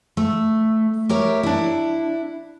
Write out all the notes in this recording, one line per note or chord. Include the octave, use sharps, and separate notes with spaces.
A3
G4 A#4 C#5 E5
D4 E4